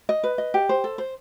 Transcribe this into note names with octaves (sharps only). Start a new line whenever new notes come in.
D#5
B4
D#5
G4
C5
A4
C5